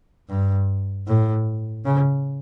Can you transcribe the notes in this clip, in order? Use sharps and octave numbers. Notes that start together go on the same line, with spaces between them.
G2
A2
C#3